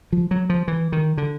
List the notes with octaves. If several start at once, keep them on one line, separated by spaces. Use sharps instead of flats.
F3
F#3
F3
E3
D#3
D3